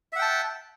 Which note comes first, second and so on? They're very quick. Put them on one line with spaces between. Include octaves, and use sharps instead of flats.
E5 F#5 G5 A5